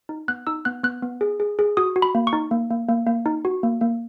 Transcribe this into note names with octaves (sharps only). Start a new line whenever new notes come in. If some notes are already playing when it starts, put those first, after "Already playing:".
D#4
B3 F#6
D#4 E6
B3 F#6
B3 F#6
B3
G#4
G#4
G#4
F#4 D#6
F#4
B5
A#3
C#6
D#4
A#3
A#3
A#3
A#3
D#4
F#4
A#3
A#3